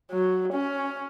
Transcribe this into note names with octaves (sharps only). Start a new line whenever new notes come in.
F#3
C#4